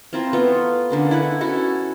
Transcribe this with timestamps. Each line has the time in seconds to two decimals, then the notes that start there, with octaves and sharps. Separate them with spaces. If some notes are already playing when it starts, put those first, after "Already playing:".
0.13 C4 E4 F4 A#4
0.33 A3 B3 F4
0.90 D3 A#3 C#4
1.11 E4 B4 F#5
1.41 C#4 E4 F#4 A4